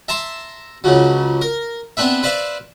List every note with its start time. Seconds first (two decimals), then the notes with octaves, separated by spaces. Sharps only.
0.08 E5 A5 A#5 C6
0.84 C#2 C#3 F3 F#3
1.41 A#4
1.97 B3 C4 D4 B4 E5
2.23 B4 C5 D5 E5 F5